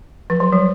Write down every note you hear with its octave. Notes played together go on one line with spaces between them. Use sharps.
F3
F#3
G3